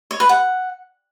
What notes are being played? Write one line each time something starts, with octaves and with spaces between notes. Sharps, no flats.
C#5
B4
F#5